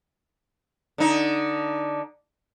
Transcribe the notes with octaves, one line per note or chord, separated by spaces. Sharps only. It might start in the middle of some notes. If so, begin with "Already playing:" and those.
D3 D#4